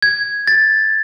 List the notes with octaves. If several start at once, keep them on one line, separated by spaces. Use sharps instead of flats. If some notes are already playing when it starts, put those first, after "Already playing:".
G#6
A6